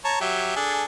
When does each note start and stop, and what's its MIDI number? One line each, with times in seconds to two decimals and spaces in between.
0.05 0.19 73
0.05 0.19 81
0.05 0.19 82
0.21 0.55 54
0.21 0.55 67
0.21 0.55 76
0.56 0.84 62
0.56 0.84 68
0.56 0.84 69